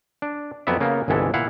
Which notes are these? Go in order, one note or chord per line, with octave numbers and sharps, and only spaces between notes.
D4
F2 F#3 B3 D5 E5
C#3 A#3 B3
G1 C2 E3 G#3 A4 E5
A#2 E4 F5 F#5